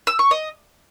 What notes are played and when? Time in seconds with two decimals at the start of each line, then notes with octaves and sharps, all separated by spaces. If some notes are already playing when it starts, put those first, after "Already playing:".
0.07 E6
0.19 C#6
0.31 D#5